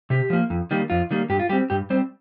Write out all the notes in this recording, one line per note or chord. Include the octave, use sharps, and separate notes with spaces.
C3 G4
F3 A#3
F2
D#3 G3 A#3
F2 F4
D#3 G3 A#3
G2 G4
F4
G3 C4 G4
G2 G4
G3 C4 C5